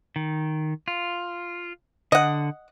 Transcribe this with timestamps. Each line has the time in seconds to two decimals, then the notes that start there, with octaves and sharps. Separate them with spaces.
0.16 D#3
0.88 F4
2.12 D3 D#5 F#5